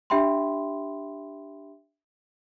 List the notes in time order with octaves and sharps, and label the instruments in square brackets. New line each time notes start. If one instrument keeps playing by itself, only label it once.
[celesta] D4 G4 E5 G5 B5 C6